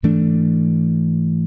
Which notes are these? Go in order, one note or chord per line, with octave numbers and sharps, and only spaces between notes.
G#2 E3 A3 D4